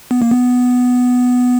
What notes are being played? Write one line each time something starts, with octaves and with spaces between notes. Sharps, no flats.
B3
A#3
B3